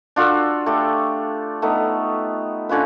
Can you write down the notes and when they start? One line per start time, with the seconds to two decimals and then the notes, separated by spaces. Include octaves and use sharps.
0.16 D4 F4 F#4 A4
0.66 A3 G4
1.62 A3 B3 D#4
2.69 D3 C#4 F4 B4